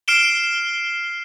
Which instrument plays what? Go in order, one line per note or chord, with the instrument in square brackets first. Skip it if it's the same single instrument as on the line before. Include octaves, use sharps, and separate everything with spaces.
[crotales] F6 C7 D7 E7 G7